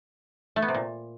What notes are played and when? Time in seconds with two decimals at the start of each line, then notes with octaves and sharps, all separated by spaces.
0.56 A3
0.62 B3
0.68 C3
0.75 A#2